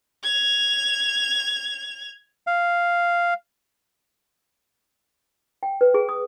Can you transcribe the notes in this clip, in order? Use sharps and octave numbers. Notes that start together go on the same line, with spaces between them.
G#6 F7
F5
G5
B4
G#4
D#6